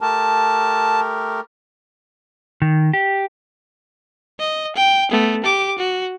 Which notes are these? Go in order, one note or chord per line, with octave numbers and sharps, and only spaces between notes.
A3 G4 A#4 A5
D#3
G4
D#5
G5
A3 B3
G4 D6
F#4